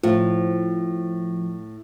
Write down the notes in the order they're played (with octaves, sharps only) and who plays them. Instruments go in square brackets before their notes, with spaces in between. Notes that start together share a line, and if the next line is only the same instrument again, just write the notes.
[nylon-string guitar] A2 [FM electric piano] F3